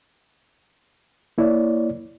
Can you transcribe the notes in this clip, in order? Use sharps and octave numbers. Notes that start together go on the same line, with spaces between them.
A#3 E4 C#5 D5